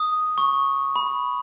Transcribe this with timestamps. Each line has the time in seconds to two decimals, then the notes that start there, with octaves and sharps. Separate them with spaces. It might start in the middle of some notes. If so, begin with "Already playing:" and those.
Already playing: D#6
0.38 C#6
0.96 B5